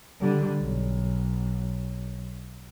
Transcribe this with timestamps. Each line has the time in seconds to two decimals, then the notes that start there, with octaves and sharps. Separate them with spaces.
0.20 D3 G3
0.58 B1